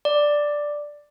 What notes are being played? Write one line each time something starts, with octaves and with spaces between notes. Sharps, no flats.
D5